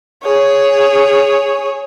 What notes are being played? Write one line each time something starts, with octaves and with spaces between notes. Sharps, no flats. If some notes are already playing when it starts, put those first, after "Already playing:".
G#4 C#5